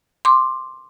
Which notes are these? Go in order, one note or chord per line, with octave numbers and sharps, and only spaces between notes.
C6 D6